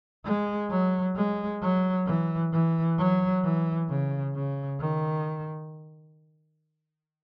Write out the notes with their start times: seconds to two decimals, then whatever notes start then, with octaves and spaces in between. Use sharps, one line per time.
0.25 G#3
0.70 F#3
1.16 G#3
1.61 F#3
2.06 E3
2.52 E3
2.98 F#3
3.44 E3
3.89 C#3
4.34 C#3
4.80 D#3